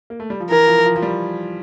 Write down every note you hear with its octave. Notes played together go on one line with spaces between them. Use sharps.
A#3
A3
G3
F3
E3 A#4
F3
F3
F3
G3